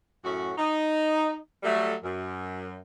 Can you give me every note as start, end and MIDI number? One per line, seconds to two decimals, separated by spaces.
0.24 0.51 42
0.24 0.51 45
0.24 0.51 61
0.24 0.51 66
0.58 1.36 63
1.63 1.93 54
1.63 1.93 55
1.63 1.93 57
2.03 2.75 42